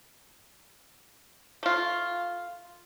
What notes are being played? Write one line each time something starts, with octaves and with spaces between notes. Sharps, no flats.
A3 F4